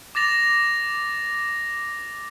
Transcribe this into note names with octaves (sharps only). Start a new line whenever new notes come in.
D6 A6 A#6 F7